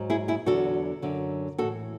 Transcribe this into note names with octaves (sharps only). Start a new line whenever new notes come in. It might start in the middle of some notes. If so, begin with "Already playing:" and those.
Already playing: G#2 F#3
E4 G#4
E4 G#4
E2 D3 F#3 F#4 A4
F#2 D3 F#3
A2 E3 F#4 A4